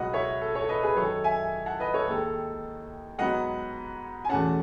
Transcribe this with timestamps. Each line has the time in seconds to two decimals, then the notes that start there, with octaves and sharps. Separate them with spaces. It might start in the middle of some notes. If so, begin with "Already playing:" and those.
Already playing: C#2 B2 F#3 B3 D#5 F#5
0.13 C#5 E5
0.41 A4
0.55 A4 C#5
0.69 B4 D#5
0.83 G#4 B4
0.96 F#2 D#3 G#3 A4 C#5
1.24 E5 G#5
1.66 F#5 A5
1.80 B4 D#5
1.94 A4 C#5
2.07 D#2 D#3 G#3 A4
3.18 G#2 F#3 B3 D#5 F#5
4.25 G#5
4.29 E2 B2 A3 C#4 F#5 A5